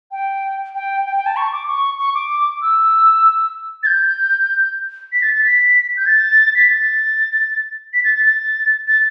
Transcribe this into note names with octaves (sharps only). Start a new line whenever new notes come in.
G5
G5
G5
G5
A5
C#6
D6
C#6
C#6
D6
E6
A6
G6
B6
A6
A6
B6
G6
A6
B6
A6
B6
A6
A6
A6
A6